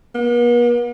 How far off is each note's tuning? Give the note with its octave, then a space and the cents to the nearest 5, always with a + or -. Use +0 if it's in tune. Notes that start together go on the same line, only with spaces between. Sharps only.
B3 -45